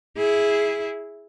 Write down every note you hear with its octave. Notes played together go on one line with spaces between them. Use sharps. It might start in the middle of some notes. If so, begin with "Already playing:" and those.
E4 G#4